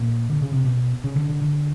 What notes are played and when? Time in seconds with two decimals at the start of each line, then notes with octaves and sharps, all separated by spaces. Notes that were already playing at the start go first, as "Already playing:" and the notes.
Already playing: A#2
0.30 D3
0.42 C#3
0.53 C3
0.65 B2
1.04 C#3
1.16 D3
1.29 D3
1.42 D3